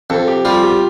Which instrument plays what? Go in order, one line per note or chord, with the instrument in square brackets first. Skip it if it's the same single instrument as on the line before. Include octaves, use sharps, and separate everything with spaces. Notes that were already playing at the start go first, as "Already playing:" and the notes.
[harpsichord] F2 [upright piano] A4
[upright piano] G4
[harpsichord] G3 [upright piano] F4
[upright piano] G4